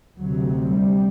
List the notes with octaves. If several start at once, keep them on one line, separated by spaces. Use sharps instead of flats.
D2 C3 F#3
G3